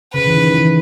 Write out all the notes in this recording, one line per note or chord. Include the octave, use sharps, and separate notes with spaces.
C#3 B4
E3
D#3
E3